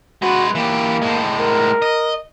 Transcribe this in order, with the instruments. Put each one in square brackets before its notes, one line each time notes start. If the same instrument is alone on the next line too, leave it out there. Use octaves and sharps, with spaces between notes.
[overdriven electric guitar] G#3 B4 [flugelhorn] F#4
[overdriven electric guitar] E3 G4 [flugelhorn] A#3
[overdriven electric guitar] A2 G#3
[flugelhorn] A#4
[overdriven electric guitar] D#5